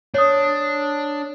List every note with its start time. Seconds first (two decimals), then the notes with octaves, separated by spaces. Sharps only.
0.14 D4 C#5 D#6